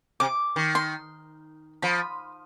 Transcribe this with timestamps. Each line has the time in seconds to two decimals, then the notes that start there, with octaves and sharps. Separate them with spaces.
0.20 C3 D6
0.56 D#3
0.75 C6
1.82 F3 B5